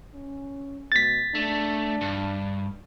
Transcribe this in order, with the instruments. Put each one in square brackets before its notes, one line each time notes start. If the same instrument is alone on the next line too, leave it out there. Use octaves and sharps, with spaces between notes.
[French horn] C#4
[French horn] B2 [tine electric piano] A6 B6
[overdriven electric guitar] A3 [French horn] D4
[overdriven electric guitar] G2